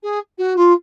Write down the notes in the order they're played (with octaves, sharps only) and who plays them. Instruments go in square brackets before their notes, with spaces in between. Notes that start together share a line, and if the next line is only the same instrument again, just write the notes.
[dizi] G#4
F#4
F4